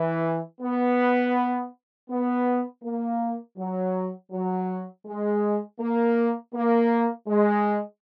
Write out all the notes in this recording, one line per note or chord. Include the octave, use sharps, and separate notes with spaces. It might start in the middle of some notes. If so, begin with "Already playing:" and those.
Already playing: E3
B3
B3
A#3
F#3
F#3
G#3
A#3
A#3
G#3